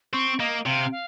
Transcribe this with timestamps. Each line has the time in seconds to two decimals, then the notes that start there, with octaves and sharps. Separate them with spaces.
0.13 C4 C#6
0.39 A#3 D#5
0.66 C3 F5
0.92 F5